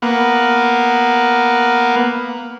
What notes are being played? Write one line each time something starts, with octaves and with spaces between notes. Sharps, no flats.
A#3 B3